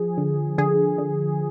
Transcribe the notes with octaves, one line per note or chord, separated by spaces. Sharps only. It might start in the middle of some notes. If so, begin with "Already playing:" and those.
Already playing: F3 G#4
D3
D3 G#4
D3